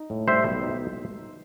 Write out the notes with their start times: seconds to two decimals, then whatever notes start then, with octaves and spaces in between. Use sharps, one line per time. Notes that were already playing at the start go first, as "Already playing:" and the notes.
Already playing: D#4
0.10 A2
0.28 G3 C5 E5
0.45 B1
0.63 D#4